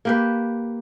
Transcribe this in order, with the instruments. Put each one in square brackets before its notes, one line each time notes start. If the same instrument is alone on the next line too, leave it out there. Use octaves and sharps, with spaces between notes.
[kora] A#3 G4 B4